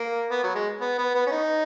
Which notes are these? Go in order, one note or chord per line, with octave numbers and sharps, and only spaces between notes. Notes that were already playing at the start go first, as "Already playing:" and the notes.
Already playing: A#3
B3
F#3
G#3
B3
B3
B3
C#4
D#4